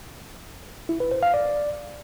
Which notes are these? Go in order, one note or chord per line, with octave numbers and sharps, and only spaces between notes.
E4
B4
C5
F5
D5